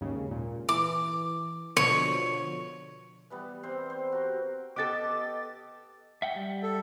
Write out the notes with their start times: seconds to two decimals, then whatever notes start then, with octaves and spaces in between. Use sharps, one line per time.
0.01 D#2 G#2 C#3
0.31 A#2
0.69 E3 D6
1.77 B2 D3 F3 C#5
3.30 E3 G3 B3
3.63 C3 G3 C4 C5
3.90 C5
4.12 F#4 A#4
4.76 B3 G4 A4 D#5 D6 A6
6.22 E5 F#5 G5
6.36 G3
6.63 A4